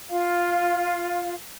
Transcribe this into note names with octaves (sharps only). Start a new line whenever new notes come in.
F4 F5